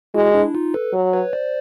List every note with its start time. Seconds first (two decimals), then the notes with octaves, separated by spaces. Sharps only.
0.14 G#3 E4 F#4
0.34 D4 E4
0.55 D#4 F4
0.74 A4 B4
0.93 F#3
1.13 B4 C#5
1.33 C5 D5